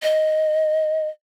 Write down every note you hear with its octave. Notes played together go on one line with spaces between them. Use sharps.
D#5